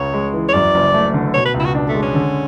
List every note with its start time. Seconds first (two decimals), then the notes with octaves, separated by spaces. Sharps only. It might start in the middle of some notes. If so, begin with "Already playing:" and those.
Already playing: C#2 C#3 C#5
0.14 G#3
0.34 E3
0.48 C#5
0.53 F#2 D5
0.74 F#1
0.94 A3
1.14 D3
1.34 B2 C#5
1.45 B4
1.54 C#2
1.60 E4
1.65 F#4
1.75 D4
1.89 A3
1.95 G#3
2.02 C#4
2.15 D3